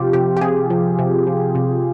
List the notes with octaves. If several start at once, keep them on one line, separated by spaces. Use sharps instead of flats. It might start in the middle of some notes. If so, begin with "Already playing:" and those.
Already playing: C3 F3 F4 G4
C3 G4
G4
C3 G#4
F3
C3
F3
C3